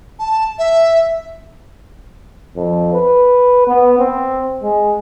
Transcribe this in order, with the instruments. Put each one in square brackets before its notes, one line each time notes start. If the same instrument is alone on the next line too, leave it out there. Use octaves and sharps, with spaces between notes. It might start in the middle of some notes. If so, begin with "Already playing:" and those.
[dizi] A5
E5
[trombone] F2
B4
B3
C4
G#3